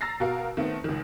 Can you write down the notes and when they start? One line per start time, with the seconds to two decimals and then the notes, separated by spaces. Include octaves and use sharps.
0.01 A#5 E6 A6 A#6 C7
0.20 B2 F#4 A#4 F5
0.57 D#3 A3 B3 C4
0.84 C#2 D#3